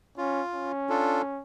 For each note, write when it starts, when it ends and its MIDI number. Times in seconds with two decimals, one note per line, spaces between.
0.18 0.41 61
0.18 0.72 65
0.54 1.42 61
0.89 1.22 62
0.89 1.22 65
0.89 1.22 69